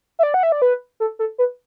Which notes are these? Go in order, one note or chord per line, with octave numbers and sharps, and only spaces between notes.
E5
D5
F#5
E5
D5
B4
A4
A4
B4